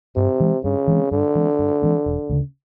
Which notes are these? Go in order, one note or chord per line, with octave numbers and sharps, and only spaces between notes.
G2 C3
E3 G#3 C4
G2 C#3
E3 G#3 C4
G2 D3
E3 G#3 C4
G2
E3 G#3 C4
E1
D2 C#3